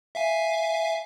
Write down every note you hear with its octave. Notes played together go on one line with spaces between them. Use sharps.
E5 F5 G#5